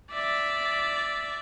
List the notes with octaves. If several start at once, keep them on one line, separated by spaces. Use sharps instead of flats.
D5 E5